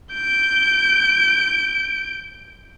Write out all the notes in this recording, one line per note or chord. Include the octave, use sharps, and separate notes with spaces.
G6 D7